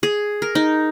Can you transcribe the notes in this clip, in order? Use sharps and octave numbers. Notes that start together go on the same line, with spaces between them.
G#4
A#4
D#4